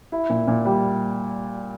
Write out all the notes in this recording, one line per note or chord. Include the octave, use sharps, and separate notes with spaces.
E4
A#2
A#2
G3